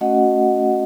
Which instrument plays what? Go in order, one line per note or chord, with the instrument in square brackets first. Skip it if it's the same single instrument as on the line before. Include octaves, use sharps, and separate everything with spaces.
[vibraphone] A3 C#4 F#4 D#5 F#5